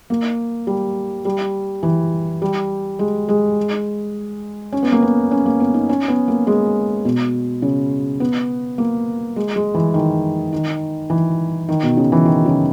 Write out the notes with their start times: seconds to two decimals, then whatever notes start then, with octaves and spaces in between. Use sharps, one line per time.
0.10 A#3
0.67 G3
1.25 G3
1.83 E3
2.42 G3
2.99 G#3
3.29 G#3
4.72 C#4
4.83 B3
4.92 A#3
5.02 B3
5.31 C#4
5.46 A#3
5.60 B3
5.74 D#4
5.89 C#4
6.08 B3
6.28 A#3
6.47 G#3
7.05 B2
7.62 C#3
8.20 B3
8.78 A#3
9.36 G#3
9.56 G#3
9.75 E3
9.94 D#3
10.52 D#3
11.10 E3
11.69 D#3
11.83 B2
11.97 C#3
12.12 E3
12.25 D#3
12.46 C#3